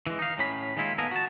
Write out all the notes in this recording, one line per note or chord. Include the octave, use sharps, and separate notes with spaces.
E3 G#3
D#4 F5
A2 C#4 B5
D#3 G#3 A#3 E4 F4
B3 A4 A#4 D#5 F5 G#5
F#4 A5